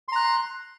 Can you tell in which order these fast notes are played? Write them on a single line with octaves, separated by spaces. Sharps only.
C6 A#5 F#6